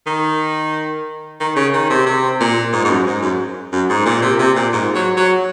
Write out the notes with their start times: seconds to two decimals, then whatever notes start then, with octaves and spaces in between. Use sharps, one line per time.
0.06 D#3
1.40 D#3
1.56 C#3
1.73 D#3
1.90 C3
2.06 C3
2.40 A#2
2.73 G#2
2.84 G#2
2.90 F#2
3.06 G#2
3.22 F#2
3.73 F#2
3.89 G#2
4.05 A#2
4.22 C3
4.39 C3
4.55 A#2
4.73 G#2
4.95 F#3
5.17 F#3